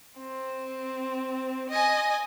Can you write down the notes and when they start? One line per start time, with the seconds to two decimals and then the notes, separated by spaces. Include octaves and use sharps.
0.19 C4
1.69 D#5 G#5